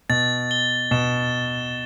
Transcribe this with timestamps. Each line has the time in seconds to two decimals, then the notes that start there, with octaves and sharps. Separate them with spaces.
0.10 B2 A6
0.51 G7
0.91 B2 E7